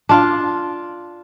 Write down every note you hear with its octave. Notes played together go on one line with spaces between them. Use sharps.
D4 F4